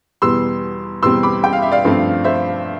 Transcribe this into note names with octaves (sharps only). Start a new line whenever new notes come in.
E2 B2 G3 B3 C6 E6
E2 B2 G3 C4 C6 E6
B5 D6
G5
F5
E5
D5 F5
G2 F3 A3 C4
C5 E5